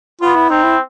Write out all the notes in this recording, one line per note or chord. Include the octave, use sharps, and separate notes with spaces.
B3 F4
E4
C4 D#4
E4